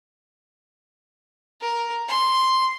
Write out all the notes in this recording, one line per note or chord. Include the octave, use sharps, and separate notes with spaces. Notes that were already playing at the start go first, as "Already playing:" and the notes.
A#4
C6